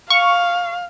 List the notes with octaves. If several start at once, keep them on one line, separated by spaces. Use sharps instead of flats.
F5 C#6